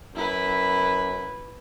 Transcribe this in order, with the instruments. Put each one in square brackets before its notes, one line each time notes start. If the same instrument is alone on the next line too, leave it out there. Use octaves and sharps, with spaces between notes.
[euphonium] F#2 [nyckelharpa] E4 B4